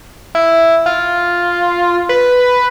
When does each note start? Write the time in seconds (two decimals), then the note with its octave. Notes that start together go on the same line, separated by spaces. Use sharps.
0.35 E4
0.86 F4
2.09 B4